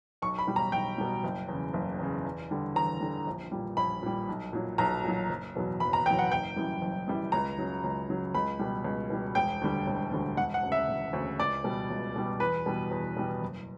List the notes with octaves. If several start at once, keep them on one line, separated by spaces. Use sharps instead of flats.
B1 C#6
B5
B2 G3
A#5
B1 G5
B2 G3
F#1
E2 C#3
F#1
E2 C#3
E2
D3 G3
E2 A#5
D3 G3
A#1
A#2 G3
A#1 B5
A#2 G3
B1
A#2 F#3
B1 A#5
A#2 F#3
F#1
E2 B2 F#3
F#1 B5
A#5
E2 B2 F#3 G5
F#5
F#1 G5
F#2 E3 G3
F#1
F#2 E3 G3
C#2 A#5
C#3 F#3
C#2
C#3 F#3
C#2 B5
B2 G3
C#2
B2 G3
E1 G5
D2 D3 G3
E1
D2 D3 G3
E1 F#5
F#5
D2 C#3
E5
E1
D2 C#3
C#2 D5
B2 G3
C#2
B2 G3
E2 B4
B2 G3
E2
B2 G3
F#1